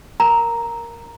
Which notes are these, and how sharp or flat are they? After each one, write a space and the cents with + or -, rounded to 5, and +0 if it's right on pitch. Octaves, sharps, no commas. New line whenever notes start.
A#4 +0 A#5 +0